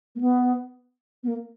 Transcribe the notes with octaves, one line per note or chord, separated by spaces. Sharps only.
A#3
B3
B3
A#3